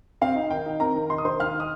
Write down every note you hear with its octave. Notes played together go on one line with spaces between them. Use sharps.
C4 F5
D#4
D#3 G5
D#4
C4 A#4 A#5
D#3
D#4 C6
D#6
D#3 C5 C6
D#3 F5 F6
D#4
D#6